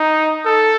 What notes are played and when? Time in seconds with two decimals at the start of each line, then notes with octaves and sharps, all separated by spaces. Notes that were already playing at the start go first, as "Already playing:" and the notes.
Already playing: D#4
0.46 A4